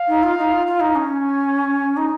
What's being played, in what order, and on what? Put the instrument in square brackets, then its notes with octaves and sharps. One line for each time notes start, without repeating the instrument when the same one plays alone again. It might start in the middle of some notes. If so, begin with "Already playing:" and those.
Already playing: [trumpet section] F5
[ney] D#4
F4
D#4
F4
F4
D#4
C#4
[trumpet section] G#5
[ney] D#4